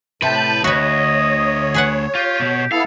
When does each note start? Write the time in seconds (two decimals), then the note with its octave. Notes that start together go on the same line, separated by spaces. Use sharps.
0.22 A2 C3 B4 A5 G6
0.64 D2 F#4 B4 C#5 D#5
1.74 G#4 B4 F#5
2.15 F4 G4
2.40 B2
2.72 B3 E4 A4 F5